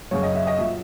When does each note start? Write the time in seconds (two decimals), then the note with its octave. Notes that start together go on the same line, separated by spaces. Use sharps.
0.11 F#2 C#3 F#3 C#5
0.23 D#5
0.35 E5
0.47 D#5
0.58 A#2 F#3 E5